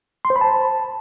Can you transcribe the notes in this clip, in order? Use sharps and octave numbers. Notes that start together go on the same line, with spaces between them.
C6
C5
B5
A5